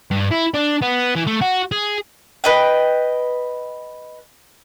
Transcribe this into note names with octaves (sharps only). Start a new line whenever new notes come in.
G2
E4
D4
B3
E3
A3
F#4
G#4
B4 D#5 G5